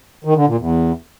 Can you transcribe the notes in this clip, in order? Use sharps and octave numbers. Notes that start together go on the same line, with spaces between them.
D#3
D3
A#2
E2